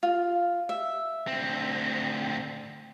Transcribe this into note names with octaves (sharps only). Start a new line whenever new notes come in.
F4
E5
D2 C4